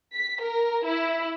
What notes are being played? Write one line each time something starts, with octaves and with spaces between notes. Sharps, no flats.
B6
A#4
E4